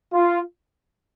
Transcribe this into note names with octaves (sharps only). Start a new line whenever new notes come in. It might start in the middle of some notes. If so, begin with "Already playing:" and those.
F4